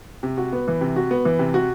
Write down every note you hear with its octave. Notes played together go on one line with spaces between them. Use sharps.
C3
F#4
B3
E3
C3
F#4
B3
E3
C3
F#4